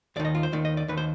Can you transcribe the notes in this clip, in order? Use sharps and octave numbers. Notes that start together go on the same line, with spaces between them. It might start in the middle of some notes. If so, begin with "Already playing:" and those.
D#2 D#3 D5
D#5
F4
C5
D#2 D#3 D5
D#5
D5
D#2 D#3 B4
C5